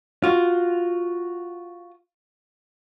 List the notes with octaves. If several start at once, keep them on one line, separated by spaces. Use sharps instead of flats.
F4 F#4